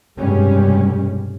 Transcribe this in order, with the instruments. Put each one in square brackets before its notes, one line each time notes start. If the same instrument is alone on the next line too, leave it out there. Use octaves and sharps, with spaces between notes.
[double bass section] F1 G2 B2 G3 G#3 C#4